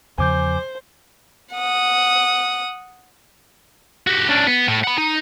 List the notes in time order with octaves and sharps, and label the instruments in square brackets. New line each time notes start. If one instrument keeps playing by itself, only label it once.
[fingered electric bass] E2 C#3 F3 [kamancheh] C5 [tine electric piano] G#5 D6 G6
[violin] F#5 D#6
[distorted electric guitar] F#4 G4
C#4 D4
B3
A2
F#5 B5
D#4